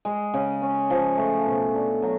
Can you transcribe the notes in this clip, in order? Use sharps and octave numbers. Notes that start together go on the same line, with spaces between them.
G#3
C#3
C#4
F3
A3
B2
D4
F#3